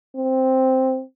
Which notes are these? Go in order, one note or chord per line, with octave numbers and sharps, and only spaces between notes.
C4